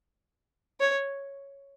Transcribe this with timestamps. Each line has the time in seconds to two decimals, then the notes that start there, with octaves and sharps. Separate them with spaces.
0.80 C#5